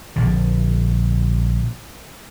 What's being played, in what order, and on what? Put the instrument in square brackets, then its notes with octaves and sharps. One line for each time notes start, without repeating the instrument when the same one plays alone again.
[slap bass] A#1 D3